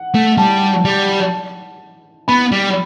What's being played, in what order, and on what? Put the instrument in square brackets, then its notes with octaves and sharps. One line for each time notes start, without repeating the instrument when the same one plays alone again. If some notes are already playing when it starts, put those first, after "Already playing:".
Already playing: [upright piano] F#5
[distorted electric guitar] A3
[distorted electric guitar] G3 [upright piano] A5
[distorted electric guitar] G3
[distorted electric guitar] B3 [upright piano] B5
[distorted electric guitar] G3